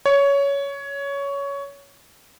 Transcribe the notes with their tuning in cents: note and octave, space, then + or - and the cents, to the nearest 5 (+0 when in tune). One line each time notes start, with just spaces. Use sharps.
C#5 +15